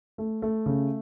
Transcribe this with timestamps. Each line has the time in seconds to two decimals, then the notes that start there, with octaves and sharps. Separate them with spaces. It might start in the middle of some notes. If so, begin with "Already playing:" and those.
0.18 A3
0.42 A3
0.66 C#3